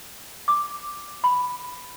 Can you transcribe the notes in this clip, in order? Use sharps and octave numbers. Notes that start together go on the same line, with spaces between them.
D6
B5